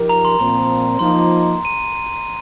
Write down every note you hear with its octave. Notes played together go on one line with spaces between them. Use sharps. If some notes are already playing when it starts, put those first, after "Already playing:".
Already playing: F3 D#4 G4 A#4
A#5
C6
A#2 F3 C4 A#5
F3 A#3 D#4 C6
D#7